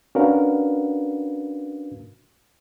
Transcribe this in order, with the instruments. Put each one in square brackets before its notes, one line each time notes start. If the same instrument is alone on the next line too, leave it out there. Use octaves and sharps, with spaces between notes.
[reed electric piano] C#4 D4 F#4 A#4 B4 F5